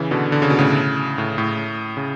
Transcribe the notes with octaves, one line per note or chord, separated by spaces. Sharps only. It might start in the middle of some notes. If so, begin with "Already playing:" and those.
Already playing: C#3 E3
B2 D3
D3
C#3
B2
A2 C#3
A2
A2
C#3